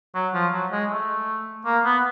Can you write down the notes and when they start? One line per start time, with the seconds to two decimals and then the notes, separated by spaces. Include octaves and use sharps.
0.15 F#3
0.34 F3
0.52 F#3
0.71 G#3
0.90 A3
1.65 A#3
1.85 B3